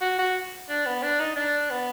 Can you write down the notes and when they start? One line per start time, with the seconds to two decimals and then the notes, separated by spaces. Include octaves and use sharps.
0.02 F#4
0.19 F#4
0.69 D4
0.86 B3
1.03 D4
1.20 D#4
1.36 D4
1.70 B3